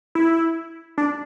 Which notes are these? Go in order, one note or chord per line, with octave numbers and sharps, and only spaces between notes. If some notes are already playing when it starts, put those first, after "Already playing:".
E4
D4